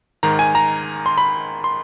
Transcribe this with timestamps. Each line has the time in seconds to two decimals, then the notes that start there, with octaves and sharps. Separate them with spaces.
0.23 G#2 D#3 A#5
0.39 G#5
0.55 A#5
1.06 C6
1.18 B5
1.64 C6